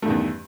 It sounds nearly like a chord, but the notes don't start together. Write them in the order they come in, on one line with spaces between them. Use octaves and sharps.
A3 G2 D#3 E2